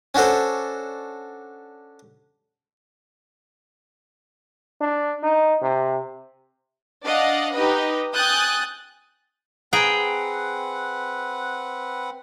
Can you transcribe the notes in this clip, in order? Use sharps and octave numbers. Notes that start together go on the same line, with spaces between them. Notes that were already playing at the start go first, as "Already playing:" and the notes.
C#4 D4 F#4 A4 C5
D4
D#4
C3
D4 D5 D#5 F5 F#5
D#4 G4 B4 D#5
G5 G#5 D#6 F#6 G6 A6
C4 G#4 B4 F#5 G5 A#5